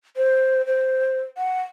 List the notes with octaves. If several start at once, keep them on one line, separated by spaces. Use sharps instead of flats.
C5
C5
F#5